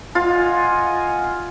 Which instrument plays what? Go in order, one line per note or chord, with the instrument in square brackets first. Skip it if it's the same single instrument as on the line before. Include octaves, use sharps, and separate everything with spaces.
[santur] F4 [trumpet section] D#5 F#5 G#5